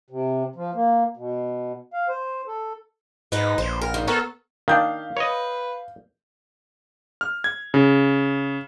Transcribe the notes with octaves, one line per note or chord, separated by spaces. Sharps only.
C3
F3
A#3
B2
F5
C5
A4
G#2 D#4 B4 D#5
A#1 C5
A#4
G#2 D#3
B3 A4 A#4 C#5
D#3 D4 F5 G6
B4 C#5 D#5
F6
G#6
C#3